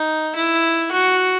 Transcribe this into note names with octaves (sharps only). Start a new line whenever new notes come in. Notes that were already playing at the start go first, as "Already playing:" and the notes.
Already playing: D#4
E4
F#4